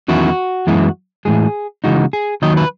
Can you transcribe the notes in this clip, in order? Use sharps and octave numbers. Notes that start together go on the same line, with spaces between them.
E2 D#3 F#3 C#4 E4 F#4
F#2 E3 G#3 B3 E4
A2 E3 G#3 G#4
C#3 E3 G#3 D#4 F#4
G#4
D#2 D#3 F#3 D#5
B4